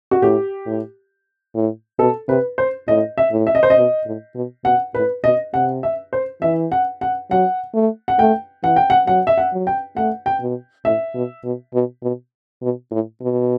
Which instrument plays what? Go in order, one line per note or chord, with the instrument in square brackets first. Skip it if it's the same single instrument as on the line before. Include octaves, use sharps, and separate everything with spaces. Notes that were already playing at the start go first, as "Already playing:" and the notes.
[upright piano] F#4
[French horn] A2 [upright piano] G4
[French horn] A2
A2
[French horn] B2 [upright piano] A4
[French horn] C3 [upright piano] B4
[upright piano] C5
[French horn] A2 [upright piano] D#5
[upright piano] E5
[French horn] A2
[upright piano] E5
D#5
C5
D#5
[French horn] B2
A2
B2
[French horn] B2 [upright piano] F#5
[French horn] A2 [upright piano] B4
[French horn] B2 [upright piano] D#5
[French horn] C3 [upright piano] F#5
[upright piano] E5
C5
[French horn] E3 [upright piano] E5
[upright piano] F#5
F#5
[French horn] F#3 [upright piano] F#5
[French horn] A3
[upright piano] F#5
[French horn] A3 [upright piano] G5
[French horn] E3 [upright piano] F#5
[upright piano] G5
F#5
[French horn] F#3 [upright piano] F#5
[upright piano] E5
F#5
[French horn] F#3
[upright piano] G5
[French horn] A3 [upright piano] F#5
[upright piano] G5
[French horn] B2
[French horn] A2 [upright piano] E5
[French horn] B2
B2
B2
B2
B2
A2
B2